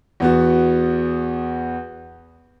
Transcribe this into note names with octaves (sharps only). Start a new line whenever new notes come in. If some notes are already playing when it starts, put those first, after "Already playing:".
E2 B3 F#4